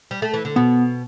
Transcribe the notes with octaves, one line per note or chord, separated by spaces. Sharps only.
G3
A3
E3
D3
B2 B3